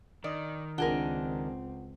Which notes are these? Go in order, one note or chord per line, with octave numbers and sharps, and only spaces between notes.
D#3 D5 D#5 D#6 D7
C#2 C4 D4 F4 G#4 A#4 F#5 G7